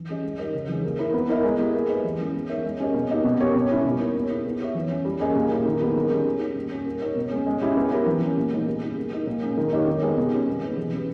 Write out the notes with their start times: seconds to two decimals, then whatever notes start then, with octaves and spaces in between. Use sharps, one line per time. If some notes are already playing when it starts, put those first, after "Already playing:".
Already playing: E3
0.09 G3 C#4 G#4 D#5
0.24 G#3
0.38 D#4 G4 A#4 D#5
0.54 C#3
0.68 E3 G#3
0.84 A#3
0.99 E4 A#4
1.14 B3
1.29 E4 A#4 D#5
1.44 G#3
1.59 B3 E4 G4
1.74 A#3
1.89 E4 G#4 B4 D#5
2.04 E3
2.19 G#3 C#4 G#4
2.34 B3
2.49 D#4 A#4 C#5 E5
2.64 G#3
2.80 C#4 G4 A#4 D#5
2.94 B2
3.10 A#3 D#4 G4
3.24 B2
3.40 A#3 C#4 G4 C#5
3.55 B2
3.70 G3 C#4 E4 G4
3.85 B2
4.00 A#3 D#4 A#4 C#5
4.14 A#3
4.30 E4 G#4
4.45 B3
4.60 G4 C#5 E5
4.75 E3
4.90 G3 C#4
5.05 G3
5.20 A#3 C#4 G#4 D#5
5.35 A#2
5.51 A#3 E4
5.65 D#3
5.80 G3 B3 D#4 G#4
5.96 D#3
6.11 G3 C#4 G#4
6.25 G3
6.41 C#4 G4
6.55 A#2
6.71 G3 C#4 G4 C#5
6.86 A#3
7.01 D#4 A#4 C#5
7.16 B2
7.31 G#3 C#4
7.46 G#3
7.61 C#4 E4 G4
7.77 B3
7.91 E4 G4 A#4
8.06 E3
8.22 A#3 C#4
8.37 A#2
8.52 G#3 B3 D#4 A#4
8.67 G3
8.82 C#4 E4 G#4
8.97 A#3
9.12 D#4 A#4
9.27 A#2
9.42 G#3 C#4
9.57 D#3
9.72 A#3 D#4 G4 C#5
9.87 D#3
10.02 G#3 B3 G4
10.17 B2
10.33 G3 C#4
10.47 B2
10.62 A#3 D#4 G#4 B4
10.77 E3
10.93 G3 C#4 G4 B4